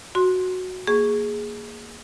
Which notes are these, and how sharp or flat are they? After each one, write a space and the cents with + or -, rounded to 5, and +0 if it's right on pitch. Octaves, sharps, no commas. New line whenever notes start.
F#4 -5 C6 +5
A#3 -5 G#4 +0 C#6 +0